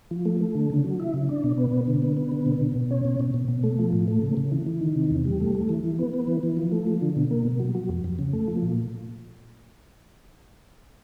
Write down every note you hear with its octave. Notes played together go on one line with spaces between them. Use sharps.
F3
A3
A3
D3
C#3
F#3
E4
C#3
D4
B2
B3
B2
D3
B3
B3
D3
B2
B2
B2
C#4
B2
B2
B2
B2
A3
F3
A2
A3
C#3
C#3
E3
E3
D#3
C3
E2
G3
A3
A3
E3
E3
B3
B3
E3
E3
F3
A3
F3
D3
B2
A#3
B2
F#3
F#3
F2
F2
C#3
A3
F3
A#2